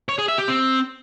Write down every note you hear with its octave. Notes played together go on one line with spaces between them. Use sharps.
C#5
G#4
E5
G4
C4